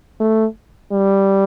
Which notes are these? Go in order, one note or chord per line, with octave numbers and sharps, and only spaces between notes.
A3
G3